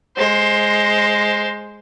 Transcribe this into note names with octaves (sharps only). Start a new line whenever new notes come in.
G#3 C5